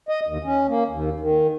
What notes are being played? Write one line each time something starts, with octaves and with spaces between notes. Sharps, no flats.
D#5
D#2
C#4
A#3
D#2
D#3